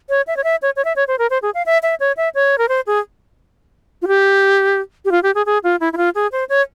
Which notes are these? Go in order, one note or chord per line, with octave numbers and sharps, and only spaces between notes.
C#5
E5
C#5
E5
C#5
C#5
E5
C#5
C5
A#4
C5
G#4
F5
E5
E5
C#5
E5
C#5
A#4
C5
G#4
F4
G4
G4
F4
G4
G#4
G#4
F4
E4
E4
F4
G#4
C5
C#5